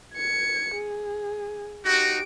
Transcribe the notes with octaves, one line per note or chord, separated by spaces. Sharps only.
G#6 C#7
G#4
D#4 F#4 G4 D7